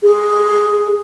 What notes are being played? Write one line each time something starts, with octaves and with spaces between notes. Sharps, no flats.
G#4